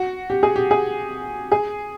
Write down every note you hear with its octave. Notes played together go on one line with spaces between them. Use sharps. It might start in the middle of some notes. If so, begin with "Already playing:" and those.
Already playing: F#4
G4
G#4
G4
G#4
G#4